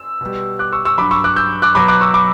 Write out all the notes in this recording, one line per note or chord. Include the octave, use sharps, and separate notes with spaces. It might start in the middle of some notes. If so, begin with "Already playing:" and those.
Already playing: E6
B2 G3
D6 F#6
C#6 E6
C#6 E6
G2 F#3 B5 D6
C#6 E6
D6 F#6
E6 G6
D6 F#6
B2 F#3 B5 D6
D6 F#6
C#6 E6
B5 D6